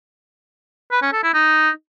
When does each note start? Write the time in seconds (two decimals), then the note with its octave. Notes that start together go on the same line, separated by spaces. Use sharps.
0.91 B4
1.02 C#4
1.13 A4
1.23 E4
1.34 D#4